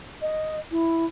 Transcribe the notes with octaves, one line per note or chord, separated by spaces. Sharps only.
D#5
E4